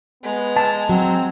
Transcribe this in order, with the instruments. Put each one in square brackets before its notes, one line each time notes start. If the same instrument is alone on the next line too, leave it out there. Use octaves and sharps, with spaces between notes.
[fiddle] G#3 A#5 [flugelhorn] B3
[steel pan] A5
[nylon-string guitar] F#3 [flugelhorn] C4